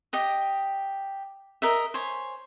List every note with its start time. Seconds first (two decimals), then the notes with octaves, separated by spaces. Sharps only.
0.13 G4 D#5 D#6
1.62 A#4 D#5 E5
1.94 C5 C#5 G#5